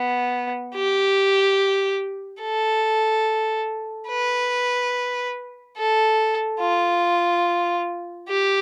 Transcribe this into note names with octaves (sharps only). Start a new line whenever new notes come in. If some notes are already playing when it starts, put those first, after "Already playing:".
Already playing: B3
G4
A4
B4
A4
F4
G4